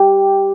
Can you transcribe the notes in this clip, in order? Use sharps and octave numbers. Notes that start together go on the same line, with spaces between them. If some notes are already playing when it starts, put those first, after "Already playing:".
Already playing: G4